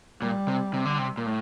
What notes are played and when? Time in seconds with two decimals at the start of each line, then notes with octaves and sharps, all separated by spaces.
0.22 A#2 G3
0.48 C3
0.74 C3
0.85 D3
0.98 C3
1.18 A#2
1.26 A2